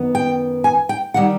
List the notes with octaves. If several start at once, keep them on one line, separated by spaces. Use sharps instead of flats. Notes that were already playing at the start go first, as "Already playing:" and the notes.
Already playing: F#2 D#3 B3
G5
G#5
G5
D#3 G3 F#5